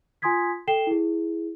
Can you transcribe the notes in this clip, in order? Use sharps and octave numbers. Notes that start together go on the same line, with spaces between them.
F4 G#5 C6 D#6 G#6 B6
A4 G5 C7 E7 G7
E4 G#4